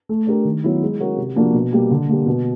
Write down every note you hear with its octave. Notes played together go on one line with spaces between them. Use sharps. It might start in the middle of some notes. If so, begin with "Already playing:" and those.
A3
D4 G4 A#4
D#3
F#3 B3 E4
G#3
C#4 F#4 A#4
C3
F3 A#3 D4 F#4
B2
G3 A#3
D3
G3 A#3
B2